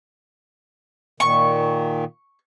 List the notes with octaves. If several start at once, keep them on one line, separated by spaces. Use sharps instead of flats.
A#2 D#3 C#6